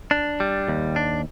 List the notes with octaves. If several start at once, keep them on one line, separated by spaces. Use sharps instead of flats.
D4
G3
D#2
D4